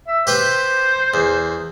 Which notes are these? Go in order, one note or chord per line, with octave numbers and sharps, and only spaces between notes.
E5
G4 B4 C5 G5
E2